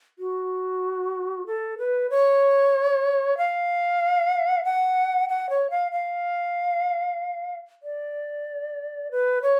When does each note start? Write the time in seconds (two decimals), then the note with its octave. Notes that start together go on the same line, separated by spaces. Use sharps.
0.19 F#4
1.47 A4
1.78 B4
2.10 C#5
3.38 F5
4.64 F#5
5.29 F#5
5.50 C#5
5.70 F5
5.92 F5
7.83 D5
9.11 B4
9.42 C#5